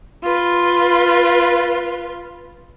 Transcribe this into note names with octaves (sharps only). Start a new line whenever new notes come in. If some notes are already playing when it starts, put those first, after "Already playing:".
F4 B4